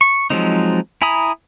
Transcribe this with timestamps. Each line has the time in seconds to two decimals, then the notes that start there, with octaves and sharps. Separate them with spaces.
0.01 C#6
0.30 F3 F#3 G#3 C4 D#4
1.02 E4 G#5 A#5 B5 D#6